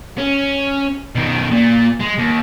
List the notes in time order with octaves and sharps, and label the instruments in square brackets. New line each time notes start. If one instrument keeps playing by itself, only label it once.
[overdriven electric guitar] C#4
B2 D#3
A#2
G#3
D#2